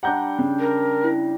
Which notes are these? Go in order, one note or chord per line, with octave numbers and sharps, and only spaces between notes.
G3 D4 F#5 A#5 G6
C#3
A#4
E4